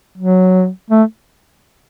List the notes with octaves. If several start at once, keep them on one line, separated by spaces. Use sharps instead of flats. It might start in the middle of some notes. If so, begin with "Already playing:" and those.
F#3
A3